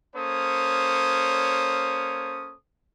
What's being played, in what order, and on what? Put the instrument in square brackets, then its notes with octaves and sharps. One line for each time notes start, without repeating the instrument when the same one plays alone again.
[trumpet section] A#3 C#4 A4 C5 C#5 D#6